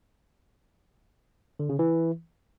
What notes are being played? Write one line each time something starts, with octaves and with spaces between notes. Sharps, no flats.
D3
C#3
E3